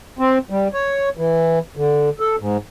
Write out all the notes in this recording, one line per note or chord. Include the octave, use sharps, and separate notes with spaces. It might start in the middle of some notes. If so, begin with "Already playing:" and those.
C4
G3
C#5
E3
D3
A4
G#2